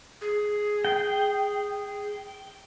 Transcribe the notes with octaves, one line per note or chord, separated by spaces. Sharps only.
G#4
G5